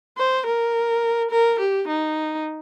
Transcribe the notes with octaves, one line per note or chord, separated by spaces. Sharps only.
C5
A#4
A#4
G4
D#4